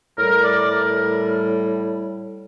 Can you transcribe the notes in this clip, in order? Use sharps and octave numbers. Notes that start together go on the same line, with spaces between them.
A2 G3 A#4
D5
A#4